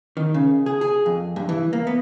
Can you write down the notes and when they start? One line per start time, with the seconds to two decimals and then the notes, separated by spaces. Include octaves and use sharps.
0.17 D#3
0.34 C#3
0.66 G#4
0.81 G#4
1.06 F2
1.36 G2
1.49 E3
1.73 A#3
1.87 B3